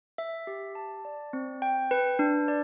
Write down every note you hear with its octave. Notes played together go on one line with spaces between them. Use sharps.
E5
G4
A5
D5
C4
G5
B4
D4
D5